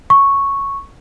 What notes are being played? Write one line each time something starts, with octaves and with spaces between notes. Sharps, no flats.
C#6